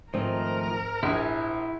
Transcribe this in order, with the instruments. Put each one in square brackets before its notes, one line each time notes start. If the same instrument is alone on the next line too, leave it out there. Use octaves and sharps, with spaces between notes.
[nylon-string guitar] G#2 [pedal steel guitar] D#3 F3 A3 [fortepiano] C4 [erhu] A#4
[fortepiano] A#1 [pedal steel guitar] E4 G#5